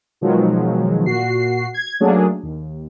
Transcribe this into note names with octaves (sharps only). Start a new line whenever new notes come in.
B2 D#3 F3 F#3 G#3
A#2 F#4 C7
G#6
F#3 A3 A#3 C#4 D4 G#4
D#2